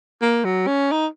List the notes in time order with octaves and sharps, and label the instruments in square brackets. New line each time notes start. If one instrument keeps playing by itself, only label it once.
[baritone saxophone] A#3
F#3
C#4
D#4